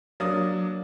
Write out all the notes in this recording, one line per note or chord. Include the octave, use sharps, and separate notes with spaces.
F#3 A#3 D4 D5 D#6